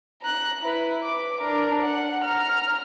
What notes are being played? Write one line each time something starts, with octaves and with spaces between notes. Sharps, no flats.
A#5 F#6
E4 B4
D6
D4 A#4
F#5
A#5 F6